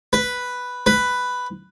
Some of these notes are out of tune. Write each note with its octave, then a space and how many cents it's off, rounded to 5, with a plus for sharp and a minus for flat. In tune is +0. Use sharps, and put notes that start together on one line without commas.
B4 +0
B4 +5